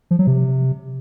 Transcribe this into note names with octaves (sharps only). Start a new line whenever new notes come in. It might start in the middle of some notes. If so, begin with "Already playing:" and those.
F3
F#3
C3